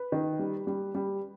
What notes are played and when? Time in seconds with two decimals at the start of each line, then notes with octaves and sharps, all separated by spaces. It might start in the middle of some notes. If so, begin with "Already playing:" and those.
Already playing: B4
0.12 D#3
0.39 G3
0.67 G3
0.95 G3